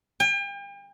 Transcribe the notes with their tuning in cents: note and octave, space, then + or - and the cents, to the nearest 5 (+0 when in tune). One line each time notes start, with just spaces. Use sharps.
G5 +40